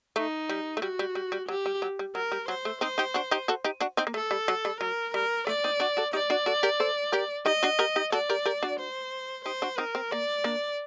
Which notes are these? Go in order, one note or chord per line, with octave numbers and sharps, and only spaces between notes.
A3 D#4
G3
A3
G3 F#4
G3
G3
G3
F#3 G4
G3
F#3
G3
F#3 A#4
G3
F#3 C5
A3
C4 D#4 C5
D#4 G4
D4 F#4
D#4 G4
F#4 A4
D#4 G4
D4 F#4
C4 D#4
A#3
A3 A4
G3
F#3
G3
F#3 A#4
G3 A#4
A3 D5
C4 D#4
D4 F#4
F#4 A4
D#4 G4 D5
D4 F#4
F#4 A4
G4 A#4
A4 C5
G4 A#4
D#4 G4 D#5
D4 F#4
G4 A#4
D#4 G4
F#4 A4 D5
G4 A#4
G4 A#4
D4 F#4
C5
D#4 G4 C5
D4 F#4
C4 D#4 A#4
C4
A#3 D5
A#3 D4